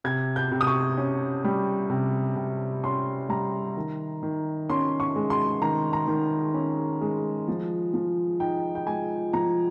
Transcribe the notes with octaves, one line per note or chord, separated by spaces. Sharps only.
C3 G#6
G6
C3
D#6
C#6
C#4
G3
C3
C3
C#4 C6
G3 A#5
D#3
D#3
C#4 C6
C#6
G#3
C6
D#3 A#5
A#5
D#3
C#4
G#3
F3
F3
D#4 G5
G5
G#3 G#5
F3 A#5